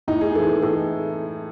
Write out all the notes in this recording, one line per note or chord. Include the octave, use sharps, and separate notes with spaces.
A2 D#4
G#4
E3 A4
A2 A4